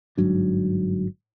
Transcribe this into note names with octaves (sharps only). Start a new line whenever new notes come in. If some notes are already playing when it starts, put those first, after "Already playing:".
G1 G#2 F#3 D4